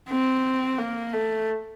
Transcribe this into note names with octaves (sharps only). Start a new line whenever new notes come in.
C4
A#3
A3